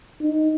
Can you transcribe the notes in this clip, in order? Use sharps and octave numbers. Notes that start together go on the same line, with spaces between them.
D#4